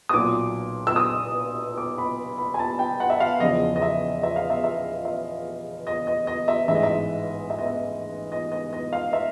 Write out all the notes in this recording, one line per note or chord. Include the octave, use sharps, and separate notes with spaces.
D#6
B1 A#2 F#3 D6
E6
D#6
D6
B5
B5
G#5
A5
G5
F#5
E5
F5
E2 C#3 F3 D#5
D#5
E5
E5
F5
E5
E5
E5
D#5
D#5
D#5
E5
A1 G#2 E3 E5
D#5
E5
E5
D#5
E5
D#5
D#5
D#5
F5
E5